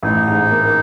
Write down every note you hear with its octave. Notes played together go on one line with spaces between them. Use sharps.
A1 D#4
G#2
A#3